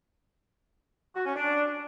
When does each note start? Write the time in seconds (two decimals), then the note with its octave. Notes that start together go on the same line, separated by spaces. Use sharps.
1.15 F#4
1.26 C#4
1.36 D4